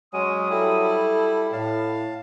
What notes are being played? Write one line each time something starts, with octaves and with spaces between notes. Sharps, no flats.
F#3 G#3 C#4 D#6
G3 E4 A4
A2 F5 A5